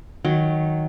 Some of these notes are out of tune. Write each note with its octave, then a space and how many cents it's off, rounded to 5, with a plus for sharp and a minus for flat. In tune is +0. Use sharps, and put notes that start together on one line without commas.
D#3 +5 F#3 -10